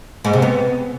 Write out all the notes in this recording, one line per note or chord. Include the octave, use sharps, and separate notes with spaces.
G#2
C3
B3